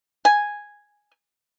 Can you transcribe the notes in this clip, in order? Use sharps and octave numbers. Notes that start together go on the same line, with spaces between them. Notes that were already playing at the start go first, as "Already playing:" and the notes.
G#5